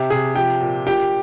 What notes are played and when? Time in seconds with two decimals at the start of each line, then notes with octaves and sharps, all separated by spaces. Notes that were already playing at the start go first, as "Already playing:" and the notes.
Already playing: C3 G4
0.10 C3 G#4
0.35 F3 G4 G5
0.61 A#2
0.86 A#2 G4 G5